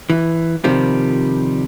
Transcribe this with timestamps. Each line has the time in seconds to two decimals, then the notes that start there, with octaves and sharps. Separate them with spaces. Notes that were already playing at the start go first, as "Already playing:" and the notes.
0.10 E3
0.64 C3 D#3 F3 G3